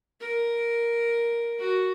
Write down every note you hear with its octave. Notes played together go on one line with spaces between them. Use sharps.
A#4
F#4